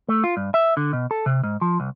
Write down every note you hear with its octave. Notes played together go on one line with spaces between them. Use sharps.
A3
F4
G2
E5
D3
B2
A4
C3
G#2
F3
C2